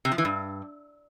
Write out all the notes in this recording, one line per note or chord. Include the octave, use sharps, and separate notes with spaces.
C3
F3
E3
G2